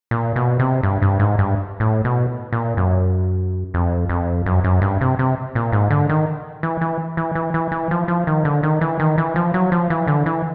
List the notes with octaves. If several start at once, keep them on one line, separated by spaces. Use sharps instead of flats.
A#2
B2
C3
G2
G2
G#2
G2
A2
B2
A#2
F#2
F2
F2
F#2
F#2
G2
C3
C3
A#2
G#2
D3
D#3
E3
E3
E3
E3
E3
E3
F3
F3
D#3
D3
D#3
E3
D#3
E3
F3
F#3
F3
E3
D3
E3